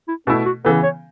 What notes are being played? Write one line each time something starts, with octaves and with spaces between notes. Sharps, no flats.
E4
B2 A3 C#4 E4
F#4
C#3 E3 B3 A4
C#5